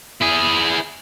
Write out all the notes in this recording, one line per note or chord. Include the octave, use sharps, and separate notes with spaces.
E4 G#4